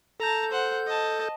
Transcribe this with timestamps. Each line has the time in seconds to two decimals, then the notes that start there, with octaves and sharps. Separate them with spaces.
0.20 A4 A5 A#5 G6
0.51 C5 F#5
0.86 D#5 A5